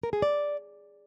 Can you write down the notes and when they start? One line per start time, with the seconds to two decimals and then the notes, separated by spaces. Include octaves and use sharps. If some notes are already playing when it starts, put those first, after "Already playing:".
0.03 A#4
0.13 G#4
0.22 D5